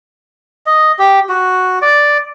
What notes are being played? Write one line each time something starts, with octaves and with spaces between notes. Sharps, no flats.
D#5
G4
F#4
D5